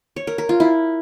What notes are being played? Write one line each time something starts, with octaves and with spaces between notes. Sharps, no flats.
C#5
A#4
A#4
F4
E4